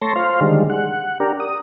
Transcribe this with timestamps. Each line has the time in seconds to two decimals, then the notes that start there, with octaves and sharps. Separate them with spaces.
0.02 A3 C#5 A5 C6 A#6
0.16 F4 C5 F5
0.41 D3 D#3 G3 G#3
0.70 F#5
1.20 D4 G4 A#4
1.40 D#6